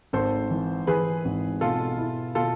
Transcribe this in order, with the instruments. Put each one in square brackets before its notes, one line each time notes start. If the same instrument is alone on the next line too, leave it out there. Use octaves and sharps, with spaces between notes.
[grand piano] G#1 [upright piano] A4 C5
[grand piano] E3
[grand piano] E3 [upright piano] G#4 B4
[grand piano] G#1
[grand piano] B2 [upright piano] F4 A4
[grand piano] E4
[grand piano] B2 [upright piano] F4 A4